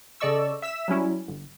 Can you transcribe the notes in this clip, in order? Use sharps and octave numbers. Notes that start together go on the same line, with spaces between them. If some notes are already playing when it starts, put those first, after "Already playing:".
C#3 A4 D5 D#5 C#6 E6
E5 E6 B6 E7
F#3 G3 C#4 E4
G1